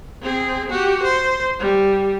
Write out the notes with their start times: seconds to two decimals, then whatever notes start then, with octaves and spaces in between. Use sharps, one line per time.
0.22 C4 G#4
0.70 F#4 G4
1.03 C5
1.59 G3